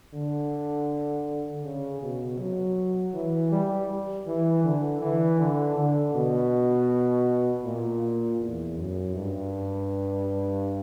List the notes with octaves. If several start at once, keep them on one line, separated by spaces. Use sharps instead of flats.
D3
C#3
B2
F#3
E3
G3
E3
D3
E3
D3
D3
B2
A#2
E2
F#2
G2